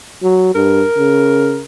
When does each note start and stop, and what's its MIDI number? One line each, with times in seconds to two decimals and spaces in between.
0.23 0.52 54
0.55 0.83 43
0.55 1.63 70
0.97 1.63 49